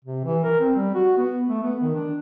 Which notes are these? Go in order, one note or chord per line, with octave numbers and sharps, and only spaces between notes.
C3
E3
A#4
C4
G3
F#4
B3
A3
B3
D#3
D4